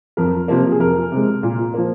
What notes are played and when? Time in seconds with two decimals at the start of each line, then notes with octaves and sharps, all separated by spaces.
0.17 F2 A#4
0.48 C3 F3 A#3
0.72 G#4
0.80 F2 A#4
1.12 C3 G#3
1.43 A#2
1.74 F3 A#3